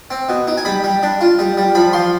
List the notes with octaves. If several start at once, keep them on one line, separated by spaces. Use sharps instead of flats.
C4
B2
D#4
G#5
G3 B5
G3
D4
F4
G3
G3
F3 B5
F3 C6